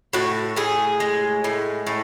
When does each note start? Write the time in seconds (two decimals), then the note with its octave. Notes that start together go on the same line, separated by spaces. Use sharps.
0.13 A2 F#4
0.56 A2 G#4
1.00 G#3
1.44 A2
1.87 A2